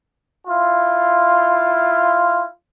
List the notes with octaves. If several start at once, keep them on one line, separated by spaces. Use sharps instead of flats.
E4 F4